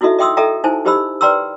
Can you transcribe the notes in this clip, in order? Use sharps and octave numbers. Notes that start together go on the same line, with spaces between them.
D#4 E4 F#4 A4 D#5 E5
D#5 E5 G5 C6 D#6 E6
A4 D#5 E5 G5 A#5
D#4 E4 C5 G#5 A5
D#4 G4 C5 D#5 B5 E6
B4 D5 G5 A#5 C6 E6